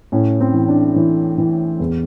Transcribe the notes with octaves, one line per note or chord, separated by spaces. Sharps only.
A2 C#4
C4
E3
D4
E3
E3
E2